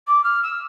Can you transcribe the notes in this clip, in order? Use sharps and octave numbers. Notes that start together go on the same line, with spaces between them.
D6
F6
E6